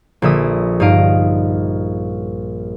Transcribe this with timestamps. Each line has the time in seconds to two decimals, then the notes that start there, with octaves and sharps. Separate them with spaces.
0.22 A#1 D3 E5 D#6
0.80 G2 D#4 D#5 F5 D7